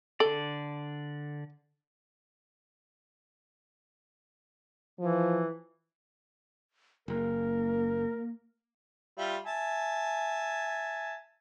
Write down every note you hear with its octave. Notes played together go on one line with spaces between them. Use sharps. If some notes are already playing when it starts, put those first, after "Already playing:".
D3 A4 D5
E3 F3
F#1 A#3 A#4
G3 F4 E5
E5 G#5 A5